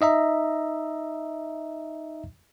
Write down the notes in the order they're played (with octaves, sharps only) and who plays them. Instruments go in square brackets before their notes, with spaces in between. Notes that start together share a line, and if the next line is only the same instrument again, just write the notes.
[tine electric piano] D#4 D#5 E5 A#5